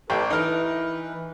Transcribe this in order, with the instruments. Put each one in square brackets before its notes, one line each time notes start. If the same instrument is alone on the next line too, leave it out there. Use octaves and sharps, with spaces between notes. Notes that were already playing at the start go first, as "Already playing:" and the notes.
[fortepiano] A1 G5 [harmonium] G4 A4 B4
[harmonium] E3 B4 [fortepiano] D#4 A#4